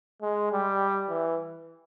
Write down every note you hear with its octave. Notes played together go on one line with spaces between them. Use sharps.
G#3
G3
E3